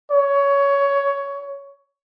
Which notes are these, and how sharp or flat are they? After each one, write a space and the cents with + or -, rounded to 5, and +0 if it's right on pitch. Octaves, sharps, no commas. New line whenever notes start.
C#5 +15